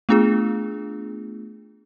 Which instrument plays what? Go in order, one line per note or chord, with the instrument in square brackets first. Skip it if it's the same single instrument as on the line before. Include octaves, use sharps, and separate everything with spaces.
[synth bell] A3 B3 D4 F4 G#4